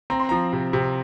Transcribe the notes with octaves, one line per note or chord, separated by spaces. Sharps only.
C4 A#5
C6
F3 A#5
C3
C3